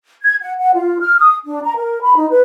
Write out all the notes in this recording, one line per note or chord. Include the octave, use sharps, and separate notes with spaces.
G#6
F#5
F#5
F4
F6
D#6
D4
A#5
A#4
B5
D#4
B4